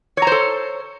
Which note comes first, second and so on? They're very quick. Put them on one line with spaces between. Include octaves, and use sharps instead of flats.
C#5 A#5 C5 A4